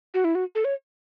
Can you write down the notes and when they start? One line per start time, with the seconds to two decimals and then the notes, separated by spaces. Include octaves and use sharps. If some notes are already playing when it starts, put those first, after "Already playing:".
0.14 F#4
0.24 E4
0.35 F#4
0.55 A4
0.65 C#5